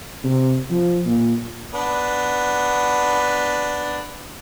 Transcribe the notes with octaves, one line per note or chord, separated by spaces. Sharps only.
C3
F3
A#2
B3 D4